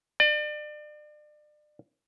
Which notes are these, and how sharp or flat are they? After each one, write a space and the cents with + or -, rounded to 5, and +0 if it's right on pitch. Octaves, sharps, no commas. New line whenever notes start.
D5 +35